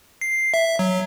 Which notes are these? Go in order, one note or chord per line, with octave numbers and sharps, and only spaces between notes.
C7
E5
F#3